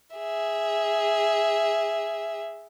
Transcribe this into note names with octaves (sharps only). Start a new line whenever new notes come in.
G#4 E5